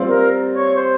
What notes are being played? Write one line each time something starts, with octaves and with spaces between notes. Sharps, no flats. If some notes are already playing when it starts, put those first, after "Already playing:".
Already playing: G3 C4 F4
A#4
C#5
C5